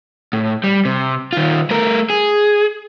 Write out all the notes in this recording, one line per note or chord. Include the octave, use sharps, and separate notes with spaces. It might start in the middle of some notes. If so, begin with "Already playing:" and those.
A2
G3
C3
D#3 F4
A3 A#4
G#4